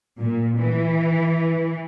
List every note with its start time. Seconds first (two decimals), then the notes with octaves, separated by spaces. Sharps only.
0.19 A#2
0.58 E3